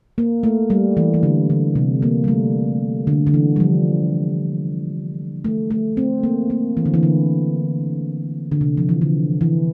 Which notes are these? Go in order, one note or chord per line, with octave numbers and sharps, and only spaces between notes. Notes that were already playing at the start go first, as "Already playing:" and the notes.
A#3
A3
G3
E3
E3
D3
D3
C3
A#3
G3
A3
D3
D3
E3
G3
F3
A3
A3
C4
A#3
A#3
E3
D3
E3
D3
D3
C3
F3
E3
D3
E3